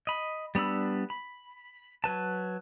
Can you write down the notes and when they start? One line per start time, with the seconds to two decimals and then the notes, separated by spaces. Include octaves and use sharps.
0.07 D#5 B5
0.55 G3 B3 D4 B5 E6
1.10 B5
2.04 F#3 B4 A5